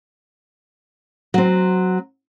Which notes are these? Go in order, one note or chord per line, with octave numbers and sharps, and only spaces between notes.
F#3 C4